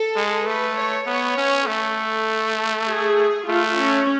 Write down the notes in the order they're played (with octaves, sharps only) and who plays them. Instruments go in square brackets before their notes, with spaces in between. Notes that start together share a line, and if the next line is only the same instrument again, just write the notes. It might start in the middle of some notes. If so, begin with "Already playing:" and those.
Already playing: [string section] A4
[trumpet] G#3
[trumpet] A3 [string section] B4
[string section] C#5
[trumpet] B3 [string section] C#5
[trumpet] C#4
[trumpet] A3 [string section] A4
[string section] G#4
[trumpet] A3 [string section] F4
[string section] C#4